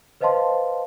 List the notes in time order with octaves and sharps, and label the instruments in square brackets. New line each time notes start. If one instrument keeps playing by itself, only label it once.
[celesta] B4 C5 D#5 F5 A5 C6